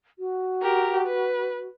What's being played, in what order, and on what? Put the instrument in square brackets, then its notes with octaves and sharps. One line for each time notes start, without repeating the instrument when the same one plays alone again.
[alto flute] F#4
[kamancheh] G4 A#4
B4